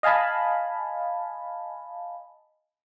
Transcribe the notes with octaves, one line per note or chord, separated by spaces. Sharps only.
D#5 F5 G#5 A5 B5